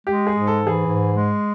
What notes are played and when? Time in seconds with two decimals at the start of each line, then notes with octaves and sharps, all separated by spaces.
0.07 G#3 G4
0.27 G#4
0.33 G#2
0.47 A4
0.60 E3
0.67 G#4
0.87 G#2
1.14 G#3